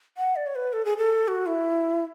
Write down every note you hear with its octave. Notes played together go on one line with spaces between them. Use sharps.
F#5
D5
C#5
B4
A4
G#4
A4
F#4
E4